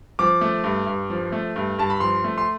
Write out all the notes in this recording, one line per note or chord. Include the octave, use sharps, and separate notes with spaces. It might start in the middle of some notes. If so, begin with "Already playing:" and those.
F3 D6
A3
G2
G2
F3
A3
G2
G2 A5
B5
F3 C6
A3
C6